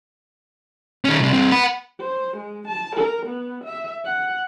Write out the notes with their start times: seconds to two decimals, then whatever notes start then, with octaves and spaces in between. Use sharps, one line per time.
1.05 D#3 C#4
1.20 C2 C3
1.33 G2 C4
1.52 F#5 B5
2.00 C5
2.37 G#3
2.67 A5
2.96 A#4
3.26 B3
3.64 E5
4.05 F#5